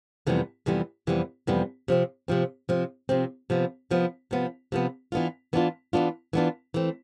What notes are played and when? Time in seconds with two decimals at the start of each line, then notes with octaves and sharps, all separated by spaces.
0.27 F2 C3 E3 G3 B3
0.66 F2 C3 E3 G3 B3
1.07 F2 C3 E3 G3 B3
1.47 F2 C3 E3 G3 B3
1.88 C3 F3 C4
2.28 C3 F3 C4
2.69 C3 F3 C4
3.09 C3 F3 C4
3.50 C3 F3 B3
3.90 C3 F3 B3
4.31 C3 F3 B3
4.72 C3 F3 B3
5.12 E3 B3 D4 F4
5.53 E3 B3 D4 F4
5.93 E3 B3 D4 F4
6.33 E3 B3 D4 F4
6.74 E3 A3 C4